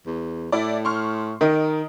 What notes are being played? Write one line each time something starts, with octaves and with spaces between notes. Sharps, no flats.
E2
A2 E4 D5
C6 C#6 F6
D#3 A#4 D#5